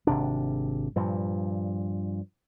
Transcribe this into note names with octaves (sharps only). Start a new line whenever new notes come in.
G#1 C3 D4
G2 A#2 F3